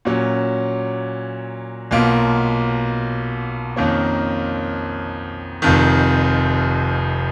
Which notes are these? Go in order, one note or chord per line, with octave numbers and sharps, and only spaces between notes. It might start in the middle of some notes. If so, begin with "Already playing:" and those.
A#2 F#3 C#4
B1 B2 A#3 F4
F2 D#3 A#3 C#4
F1 F2 D#3